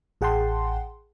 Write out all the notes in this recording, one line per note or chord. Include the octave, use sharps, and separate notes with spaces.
A1 G#4 F#5 G5 A5 C6